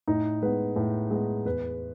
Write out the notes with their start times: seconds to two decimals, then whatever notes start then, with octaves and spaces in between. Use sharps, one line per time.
0.08 A2 D#4
0.42 G#3 B3 B4
0.76 A2
1.11 G#3 B3
1.45 E2 B4